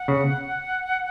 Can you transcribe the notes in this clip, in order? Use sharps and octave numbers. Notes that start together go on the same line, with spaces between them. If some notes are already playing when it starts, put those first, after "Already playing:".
Already playing: F#5
C#3